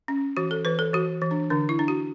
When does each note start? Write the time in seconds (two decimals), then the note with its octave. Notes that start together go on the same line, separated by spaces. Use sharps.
0.08 C#4
0.37 E3 F#4
0.51 A4
0.65 E3 B4
0.79 A4
0.93 E3 F#4
1.22 E3
1.31 D4
1.50 D3 D4
1.69 E4
1.79 D4
1.88 F#4